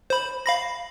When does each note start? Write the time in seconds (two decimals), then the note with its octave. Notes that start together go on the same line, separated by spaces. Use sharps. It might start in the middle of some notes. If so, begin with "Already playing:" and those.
0.10 C5 B5
0.46 F5 B5 A#6